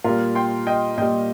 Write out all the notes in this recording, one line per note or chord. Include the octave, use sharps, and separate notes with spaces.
A#2 G3 F4 A#4
G5 C6
D#5 G5
A#2 G3 D#5 G5